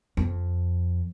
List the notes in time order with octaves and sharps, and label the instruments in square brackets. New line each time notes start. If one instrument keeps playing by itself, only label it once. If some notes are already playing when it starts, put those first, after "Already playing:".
[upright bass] F2